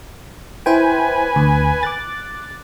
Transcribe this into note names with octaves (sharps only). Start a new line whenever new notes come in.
E4 B4 C5 G5 G#5
D2
D6 F#6 A6